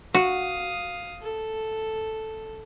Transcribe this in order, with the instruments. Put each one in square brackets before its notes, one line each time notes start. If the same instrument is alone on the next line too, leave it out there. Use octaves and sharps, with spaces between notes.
[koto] F#4 [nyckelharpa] F5 D#6
[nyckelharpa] A4